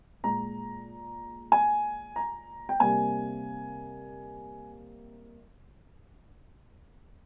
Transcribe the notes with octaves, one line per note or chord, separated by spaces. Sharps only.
A#2 G#3 A#5
G#5
A#5
G5
C3 G3 A#3 G#5